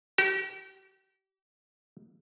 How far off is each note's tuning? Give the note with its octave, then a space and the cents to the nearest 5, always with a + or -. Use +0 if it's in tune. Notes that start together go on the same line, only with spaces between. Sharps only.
G4 -40